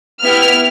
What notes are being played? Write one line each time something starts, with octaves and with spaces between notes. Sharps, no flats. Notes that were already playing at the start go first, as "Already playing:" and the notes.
B3 E4 G4 F6